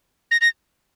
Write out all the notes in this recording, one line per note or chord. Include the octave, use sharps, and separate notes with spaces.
A#6
A#6